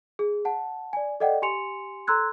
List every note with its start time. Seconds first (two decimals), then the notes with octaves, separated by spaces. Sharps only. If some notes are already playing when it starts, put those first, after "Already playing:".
0.19 G#4
0.45 F#5 A5
0.93 D5 G#5
1.20 A4 D5 D#5 F#5 G5
1.42 G4 G#5 C6 C#7 F7
2.07 A4 A#5 C6 E6 F#6 G#6